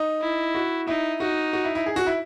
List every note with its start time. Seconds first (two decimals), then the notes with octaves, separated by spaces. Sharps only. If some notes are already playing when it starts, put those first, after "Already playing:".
Already playing: D#4
0.21 E4
0.55 F#4
0.87 D#4 E4
1.20 D#4 F#4
1.53 F#4
1.64 E4
1.75 E4
1.86 G#4
1.96 F#4
2.07 E4